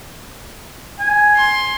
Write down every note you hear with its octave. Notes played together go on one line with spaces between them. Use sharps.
G#5
C6